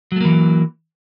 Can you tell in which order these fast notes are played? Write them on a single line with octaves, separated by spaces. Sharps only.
F#3 A3 A#3 E3